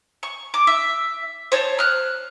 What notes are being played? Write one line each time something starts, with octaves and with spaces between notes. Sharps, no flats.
C#6
D6
E5
C5 C#5 A5
F6 F#6